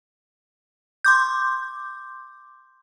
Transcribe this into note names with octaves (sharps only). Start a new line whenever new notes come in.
C6 D6 G6